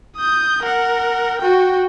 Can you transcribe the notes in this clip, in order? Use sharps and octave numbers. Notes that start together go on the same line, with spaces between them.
D#6 G6
A#4 F#5
F#4 G5